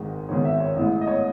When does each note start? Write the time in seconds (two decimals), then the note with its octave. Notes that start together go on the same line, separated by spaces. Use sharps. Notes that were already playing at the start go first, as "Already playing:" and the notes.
Already playing: G#1 G#2 D#3 G#3
0.29 G#1 G#2 D#3 G#3 C#5
0.45 E5
0.60 C#5
0.76 A1 A2 G#3
1.01 D#5
1.07 C#5